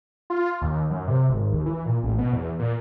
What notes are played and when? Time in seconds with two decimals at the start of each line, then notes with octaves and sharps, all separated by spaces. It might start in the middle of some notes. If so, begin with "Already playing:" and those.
0.30 F4
0.61 D#2
0.90 F#2
1.08 C3
1.30 G#1
1.52 D#2
1.66 E3
1.86 A#2
2.03 A1
2.18 B2
2.33 E2
2.59 A#2